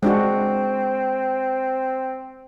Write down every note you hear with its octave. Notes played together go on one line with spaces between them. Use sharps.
G#3 C4 D4 F#4